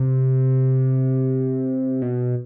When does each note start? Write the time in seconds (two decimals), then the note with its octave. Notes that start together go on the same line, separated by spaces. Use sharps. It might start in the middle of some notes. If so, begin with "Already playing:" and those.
Already playing: C3
2.02 B2